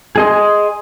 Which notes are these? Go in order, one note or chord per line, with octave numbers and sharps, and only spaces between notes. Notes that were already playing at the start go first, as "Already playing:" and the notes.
G#4 D#5 C6